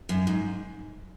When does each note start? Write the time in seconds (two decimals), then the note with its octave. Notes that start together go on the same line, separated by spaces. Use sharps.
0.09 F#2
0.27 G#2